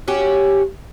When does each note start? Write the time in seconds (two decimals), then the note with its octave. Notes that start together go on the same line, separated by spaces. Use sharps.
0.08 C#4 F#4 G4